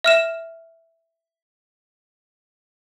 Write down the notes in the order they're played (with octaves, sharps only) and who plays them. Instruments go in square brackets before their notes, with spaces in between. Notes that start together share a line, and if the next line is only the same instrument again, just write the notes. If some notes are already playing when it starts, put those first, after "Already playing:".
[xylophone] E5 F6 E7